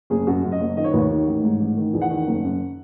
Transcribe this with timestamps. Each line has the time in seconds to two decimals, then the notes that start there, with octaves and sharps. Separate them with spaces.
0.10 F#1 G#4
0.27 F#2 F#4
0.44 F#2
0.52 D#5
0.60 F#1
0.77 D#3 D#5
0.84 C#5
0.91 D#2 B4
0.99 C#5
1.10 D#3
1.27 A1
1.43 G#2
1.60 A1
1.77 D#3
1.93 E2
2.01 F#5
2.10 D#3
2.27 F#1
2.44 F#2